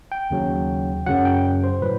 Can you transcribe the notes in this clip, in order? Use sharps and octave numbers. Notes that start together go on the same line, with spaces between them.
G5
D#2 C#3 F#3
F#2 C#3 F#3 F#5
G5
C5
A2 F#3 B4